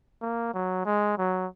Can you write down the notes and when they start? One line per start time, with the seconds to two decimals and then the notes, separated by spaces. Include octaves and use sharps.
0.22 A#3
0.54 F#3
0.86 G#3
1.18 F#3